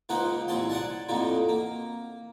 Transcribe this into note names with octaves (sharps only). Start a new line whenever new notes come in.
C#2 F3 A#3 D#4 C5 F#5
C2 A#2 F#3 G#3 A5 C6
D5 F#5 G#5 A5
F2 A2 F#3 A#3 D#4
A#3